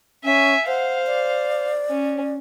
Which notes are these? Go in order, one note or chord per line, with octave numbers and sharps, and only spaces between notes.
C#4 E5 G#5
C5 F5 F#5
D5
C#4